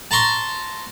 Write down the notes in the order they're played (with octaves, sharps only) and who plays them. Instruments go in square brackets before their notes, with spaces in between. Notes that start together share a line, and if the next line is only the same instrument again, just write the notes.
[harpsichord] A5 A#5 C6 C#6